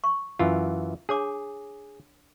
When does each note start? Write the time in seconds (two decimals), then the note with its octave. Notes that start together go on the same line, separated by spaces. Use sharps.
0.04 C#6
0.39 F#2 E3 F4
1.09 D4 G#4 C#5 D6